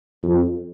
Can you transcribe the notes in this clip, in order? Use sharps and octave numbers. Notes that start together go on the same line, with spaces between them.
F2